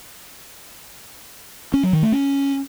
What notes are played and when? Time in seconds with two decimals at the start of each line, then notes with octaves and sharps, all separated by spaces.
1.74 C#4
1.83 F#3
1.93 D#3
2.03 A3
2.12 C#4